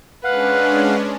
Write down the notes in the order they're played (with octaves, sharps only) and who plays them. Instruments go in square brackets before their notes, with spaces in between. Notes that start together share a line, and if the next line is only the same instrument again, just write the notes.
[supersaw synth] G#3 C#4 D4 [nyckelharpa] B4 [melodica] F5 F#5